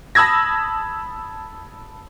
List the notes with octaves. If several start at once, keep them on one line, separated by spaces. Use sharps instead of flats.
A5 B5 D#6 E6 G#6 A#6